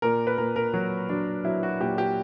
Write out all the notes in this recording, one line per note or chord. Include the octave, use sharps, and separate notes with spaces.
A#2 A#4
B4
A#2 A#4
A#4
F#3 F#4
F#3 D4
F#3 E4
F#4
A#2 G4
G4